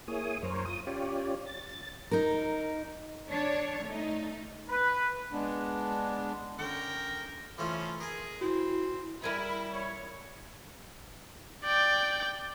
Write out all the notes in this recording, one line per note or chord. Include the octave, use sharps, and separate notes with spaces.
A#3 E4 G#4 C#5 D#6
F#2 A#4 C5 C#5
F4 D#6
C#4 F4 G4 C#5 D5
A6
D#4 A#4
D4 C#5
A3 D#4
B4
G#3 B3 D4
D3 C#4 A#4 G5
E3 F3 A3 C#4 F4
G#4 A#4 G#5
C4 E4 F#4
G3 E4 A#4 G#5
C#5
D5 G5